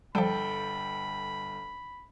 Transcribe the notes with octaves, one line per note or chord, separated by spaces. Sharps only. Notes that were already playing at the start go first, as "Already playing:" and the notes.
G1 F3 G3 A4 G5 B5